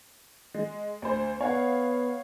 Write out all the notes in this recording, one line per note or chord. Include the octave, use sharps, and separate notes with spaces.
G#3
D2 C5
B3 C#5 F5 F#5